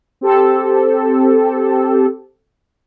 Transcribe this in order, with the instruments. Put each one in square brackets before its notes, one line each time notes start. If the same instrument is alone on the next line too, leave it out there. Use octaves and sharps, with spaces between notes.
[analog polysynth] C4 G4 A4